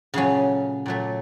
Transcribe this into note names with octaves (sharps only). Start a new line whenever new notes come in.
A#2 C#3 F#3 A3 C#4
A#2 F#3 A3